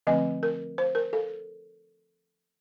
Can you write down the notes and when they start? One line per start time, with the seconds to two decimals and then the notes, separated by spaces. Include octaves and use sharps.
0.07 D3 F3 A3 C4 D#5
0.43 A#4
0.78 C5
0.95 A#4
1.13 A4